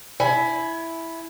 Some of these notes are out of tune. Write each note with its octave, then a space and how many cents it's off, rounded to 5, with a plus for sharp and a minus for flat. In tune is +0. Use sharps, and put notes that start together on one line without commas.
E4 +0 G#5 +25